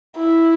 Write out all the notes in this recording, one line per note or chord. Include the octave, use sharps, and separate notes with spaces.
E4